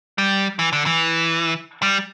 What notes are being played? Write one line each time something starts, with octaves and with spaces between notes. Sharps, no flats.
G3
E3
D3
E3
G3